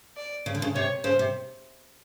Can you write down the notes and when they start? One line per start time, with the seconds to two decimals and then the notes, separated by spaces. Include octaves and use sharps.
0.17 D5
0.46 C#3
0.55 D3
0.62 C#3
0.75 C3 C#5
1.04 C#3 C5
1.19 C3